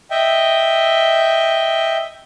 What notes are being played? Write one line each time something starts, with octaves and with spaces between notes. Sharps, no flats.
D#5 E5 G5